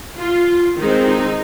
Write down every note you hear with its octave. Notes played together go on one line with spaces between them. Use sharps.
F4
D#3 G#3 C4 D#4
D#4